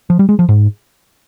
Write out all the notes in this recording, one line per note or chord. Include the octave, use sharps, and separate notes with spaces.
F3
G3
G#3
F3
G#2